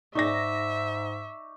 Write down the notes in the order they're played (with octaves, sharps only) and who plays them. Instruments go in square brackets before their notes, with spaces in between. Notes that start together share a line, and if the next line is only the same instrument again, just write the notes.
[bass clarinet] G#2 [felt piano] D#4 D5 A#6 [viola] E5 [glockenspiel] C#6 D6